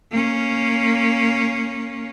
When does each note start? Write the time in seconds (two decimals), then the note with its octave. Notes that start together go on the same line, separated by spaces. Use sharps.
0.11 A#3 C#4